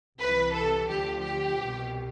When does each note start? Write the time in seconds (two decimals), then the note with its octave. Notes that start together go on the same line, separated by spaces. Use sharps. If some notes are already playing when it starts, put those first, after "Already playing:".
0.20 C2 C3 E3 B4
0.54 A4
0.88 D2 D3 F3 G4
1.22 G4
1.57 C2 B2